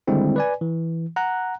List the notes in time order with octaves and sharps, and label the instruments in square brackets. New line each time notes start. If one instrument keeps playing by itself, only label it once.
[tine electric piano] D3 D#3 G3 G#3 C4 E4
B4 D5 G#5
E3
F#5 A#5 F#6